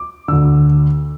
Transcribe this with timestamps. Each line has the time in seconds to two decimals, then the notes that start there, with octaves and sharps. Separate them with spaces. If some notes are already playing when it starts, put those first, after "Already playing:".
Already playing: D6
0.28 D2 D3 E6